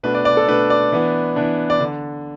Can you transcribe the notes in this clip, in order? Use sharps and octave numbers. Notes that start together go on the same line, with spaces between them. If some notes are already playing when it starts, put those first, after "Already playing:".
B2 A3 D4 B4
D5
D5
A4
B2 A3 D4 B4
D5
E3 B3 D4
E3 B3 D4
D5
D3